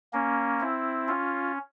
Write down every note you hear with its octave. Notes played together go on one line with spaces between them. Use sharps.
A#3 C#4
C4 E4
C#4 F4